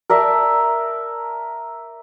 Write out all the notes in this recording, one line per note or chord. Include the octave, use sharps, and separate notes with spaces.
A#4 D5 E5 A5